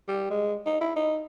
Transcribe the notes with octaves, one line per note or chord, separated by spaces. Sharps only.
G3
G#3
D#4
E4
D#4